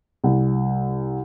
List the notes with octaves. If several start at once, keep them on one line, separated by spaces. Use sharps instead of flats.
C2